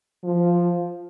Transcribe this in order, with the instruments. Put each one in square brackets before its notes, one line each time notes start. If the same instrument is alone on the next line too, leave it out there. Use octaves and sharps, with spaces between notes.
[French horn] F3